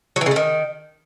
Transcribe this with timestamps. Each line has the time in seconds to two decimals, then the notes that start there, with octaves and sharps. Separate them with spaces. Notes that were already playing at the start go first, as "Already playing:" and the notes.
0.16 F#3
0.21 E3
0.26 C#3
0.31 A3
0.36 D#3